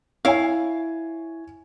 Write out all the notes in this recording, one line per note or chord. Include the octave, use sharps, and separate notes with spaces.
E4 C#5 F5 G#5